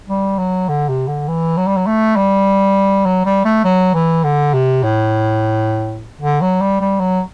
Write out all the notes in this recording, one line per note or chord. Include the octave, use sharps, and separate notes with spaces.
G3
F#3
D3
C3
D3
E3
F#3
G3
F#3
A3
G3
F#3
G3
A3
F#3
E3
D3
C3
A2
D3
F#3
G3
G3
F#3